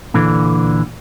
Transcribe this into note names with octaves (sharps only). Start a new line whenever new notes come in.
A#2 D3 E3